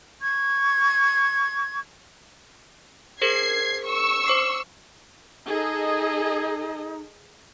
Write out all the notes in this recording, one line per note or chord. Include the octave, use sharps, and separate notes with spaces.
C#6 G#6
G#4 A#4 C5 G#6 C7
C#6 E6
C5 D6 C7
D#4 G#4 A4 D#5